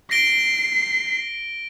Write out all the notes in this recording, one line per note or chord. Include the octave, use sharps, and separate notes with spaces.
A#6 C7 D7 G7